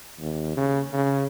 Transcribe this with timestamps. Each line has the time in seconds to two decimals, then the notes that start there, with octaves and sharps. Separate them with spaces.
0.19 D#2
0.56 C#3
0.92 C#3